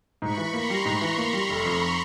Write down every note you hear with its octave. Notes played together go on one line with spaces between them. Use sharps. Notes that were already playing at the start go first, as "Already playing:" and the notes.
G#2 B5 C#6
E3
A#3 A#5 C6
G3
G#2
E3
A#3
G3
F1
F2